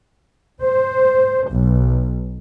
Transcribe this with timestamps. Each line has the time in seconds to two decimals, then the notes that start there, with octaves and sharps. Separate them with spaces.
0.63 C5
1.50 B1